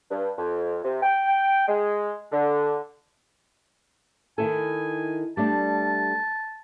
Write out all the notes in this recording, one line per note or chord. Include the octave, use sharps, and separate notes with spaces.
G2
F2
C3
G5
G#3
D3
D#3 E4 A4 G#5
G3 A3 D4 A5